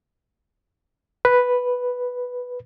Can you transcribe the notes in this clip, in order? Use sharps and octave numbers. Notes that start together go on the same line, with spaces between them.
B4